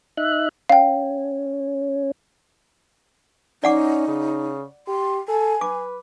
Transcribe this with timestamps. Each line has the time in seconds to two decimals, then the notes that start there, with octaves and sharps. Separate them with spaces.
0.17 D#4 E5 F#6
0.69 C#4 F5 G5
3.64 C#4 D#4 D5 F#5 D6
4.08 C#3
4.88 G4 C6
5.28 A4 G#5
5.61 B4 D6